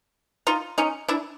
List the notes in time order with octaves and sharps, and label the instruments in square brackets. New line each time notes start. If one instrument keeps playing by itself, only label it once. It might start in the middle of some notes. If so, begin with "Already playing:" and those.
[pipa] D#4 F4
C#4 D#4
D4 E4